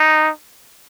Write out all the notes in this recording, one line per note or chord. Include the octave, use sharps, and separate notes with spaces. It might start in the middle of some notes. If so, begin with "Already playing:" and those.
Already playing: D#4